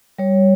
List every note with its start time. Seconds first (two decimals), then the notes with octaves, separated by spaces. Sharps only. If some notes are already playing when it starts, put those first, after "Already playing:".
0.19 G3 C#5